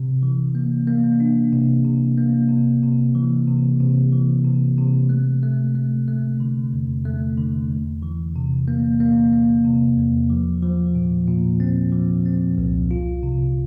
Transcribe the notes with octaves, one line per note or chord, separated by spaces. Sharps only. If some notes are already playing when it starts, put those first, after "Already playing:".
Already playing: C3
E3
A#3
A#3
D4
C3
C3
A#3
C3
C3
E3
C3
C3
E3
C3
C3
A3
A3
A3
A3
D3
E2
A3
D3
E2
E3
C3
A#3
A#3
A#3
C3
E2
F3
F3
A#2
A#2
C4
F3
C4
C2
F4
C3